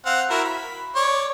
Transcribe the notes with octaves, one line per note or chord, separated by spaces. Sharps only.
C4 F5 F#5
E4 F#4 A#4
B5
C#5 D5